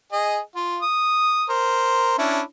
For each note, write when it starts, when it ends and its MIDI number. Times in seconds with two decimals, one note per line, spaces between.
0.12 0.39 68
0.12 0.39 75
0.56 0.80 65
0.82 1.44 87
1.50 2.13 70
1.50 2.13 72
2.18 2.41 61
2.18 2.41 62
2.18 2.41 64